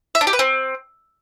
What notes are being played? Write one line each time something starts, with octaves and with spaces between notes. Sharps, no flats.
E5
D4
G4
B4
C4